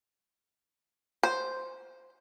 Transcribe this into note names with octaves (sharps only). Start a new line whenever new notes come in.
C5